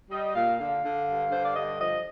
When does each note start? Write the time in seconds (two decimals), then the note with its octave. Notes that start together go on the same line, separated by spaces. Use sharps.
0.10 G3 D#5
0.35 A#2 F5
0.59 D3 F5
0.83 D3
1.07 G2
1.31 D3 C5
1.44 D5
1.55 G2 D#5
1.80 F3 D#5